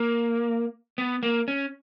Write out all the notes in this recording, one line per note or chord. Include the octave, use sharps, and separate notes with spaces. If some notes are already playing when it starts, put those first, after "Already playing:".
Already playing: A#3
B3
A#3
C#4